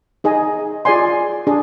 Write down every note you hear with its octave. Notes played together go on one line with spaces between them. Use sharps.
D#4 G#4 D#5 G#5
F4 G#4 D5 G#5 C6
D4 G#4